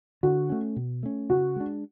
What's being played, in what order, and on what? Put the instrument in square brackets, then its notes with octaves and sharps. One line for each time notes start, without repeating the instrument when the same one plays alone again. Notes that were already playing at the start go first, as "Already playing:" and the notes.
[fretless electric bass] D3 [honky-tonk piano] F#4
[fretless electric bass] A3 C#4
B2
A3 C#4
[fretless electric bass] C#3 [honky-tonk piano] F#4
[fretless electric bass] G#3 D4